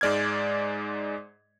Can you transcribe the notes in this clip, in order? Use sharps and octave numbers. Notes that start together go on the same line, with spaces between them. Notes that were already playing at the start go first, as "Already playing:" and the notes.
G#2 G#3 D5 F6 G#6